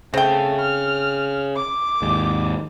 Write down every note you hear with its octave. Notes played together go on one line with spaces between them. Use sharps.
C#3 A3 C4 G5
F6
D6
D#2 G#2